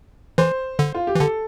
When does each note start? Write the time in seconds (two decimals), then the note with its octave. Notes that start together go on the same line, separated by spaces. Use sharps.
0.38 E3 C5
0.79 D3
0.94 F4
1.07 G4
1.15 E3
1.20 D3 A4